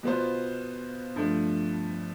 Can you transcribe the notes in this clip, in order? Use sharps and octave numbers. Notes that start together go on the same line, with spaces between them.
B2 B3 F4 C5
G2 F3 A3